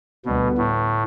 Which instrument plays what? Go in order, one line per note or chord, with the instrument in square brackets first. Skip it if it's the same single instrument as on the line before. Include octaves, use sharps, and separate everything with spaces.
[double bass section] D2 D3 G3 B3 [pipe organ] B2
[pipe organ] A2